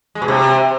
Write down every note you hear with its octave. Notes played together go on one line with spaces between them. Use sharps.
G#3
B2
C3